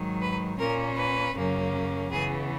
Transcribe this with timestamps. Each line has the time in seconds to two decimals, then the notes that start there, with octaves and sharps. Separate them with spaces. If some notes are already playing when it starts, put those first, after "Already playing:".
Already playing: G#2 D#3 F#3
0.21 B4
0.58 A#2 A#3 C#4 A#4
0.97 B4
1.35 F#2 C#3 F#3 A#3 C#4
2.10 C#3 E3 B3 G#4